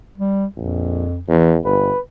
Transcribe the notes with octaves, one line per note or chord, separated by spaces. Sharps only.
G3
A#1 F2
E2 E3
G1 B4